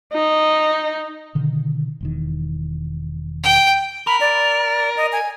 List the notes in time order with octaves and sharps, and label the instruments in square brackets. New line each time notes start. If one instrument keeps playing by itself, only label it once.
[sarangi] D#4
[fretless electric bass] B2 D3 D#3
E1 E2 D#3
[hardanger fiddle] G5
[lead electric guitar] A#4 [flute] B5
[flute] D5
D#5
G#5